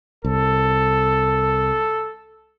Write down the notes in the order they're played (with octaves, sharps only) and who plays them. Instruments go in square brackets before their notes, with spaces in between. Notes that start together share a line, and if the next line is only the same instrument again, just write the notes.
[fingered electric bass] C2 [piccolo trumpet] A4